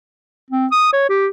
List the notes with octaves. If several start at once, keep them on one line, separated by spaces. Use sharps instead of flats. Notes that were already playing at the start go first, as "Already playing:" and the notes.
C4
D#6
C#5
G4